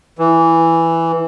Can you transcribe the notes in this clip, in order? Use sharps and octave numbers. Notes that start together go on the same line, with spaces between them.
E3